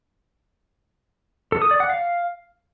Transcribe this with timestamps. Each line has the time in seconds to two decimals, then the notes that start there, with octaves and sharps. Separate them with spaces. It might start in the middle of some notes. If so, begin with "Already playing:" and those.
1.52 A4
1.62 D#6
1.71 D5
1.80 F#5
1.89 F5